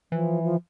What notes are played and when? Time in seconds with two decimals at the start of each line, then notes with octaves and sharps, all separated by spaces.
0.12 E3 F3
0.43 F3